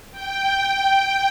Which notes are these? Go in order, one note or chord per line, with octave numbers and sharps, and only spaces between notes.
G5